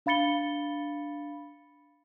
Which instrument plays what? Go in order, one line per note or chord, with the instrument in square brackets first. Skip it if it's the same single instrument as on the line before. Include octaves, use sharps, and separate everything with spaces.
[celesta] D4 F5 B5 A6 C#7 G7